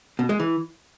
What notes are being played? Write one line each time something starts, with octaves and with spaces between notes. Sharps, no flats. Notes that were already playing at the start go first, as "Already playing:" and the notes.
B2
G#3
E3